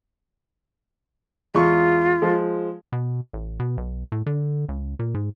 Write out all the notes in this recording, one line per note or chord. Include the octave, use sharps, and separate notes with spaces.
E2 G#3 F4 C#6
F3 G#3
B2
A1
B2
B1
A2
D3
C#2
A#2
G#2